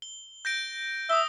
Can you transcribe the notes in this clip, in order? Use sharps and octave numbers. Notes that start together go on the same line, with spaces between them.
G7
G6 A#6 D7
E5 D#6 G7